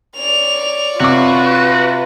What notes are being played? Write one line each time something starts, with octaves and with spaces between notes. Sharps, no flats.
C#5 D5 F7
C3 F4 F#4 B4 D6